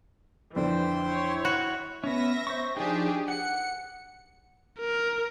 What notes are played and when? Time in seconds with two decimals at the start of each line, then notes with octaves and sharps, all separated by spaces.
0.56 F2 D3 E3 D4 C5 G5 C6
1.08 E4 C#5
1.45 F#4 B5
2.04 B3 C#4 E5 A#6
2.47 C5 C#6
2.77 F3 D4 D#4 G4 G#4
3.28 F#5 C#7
4.80 A#4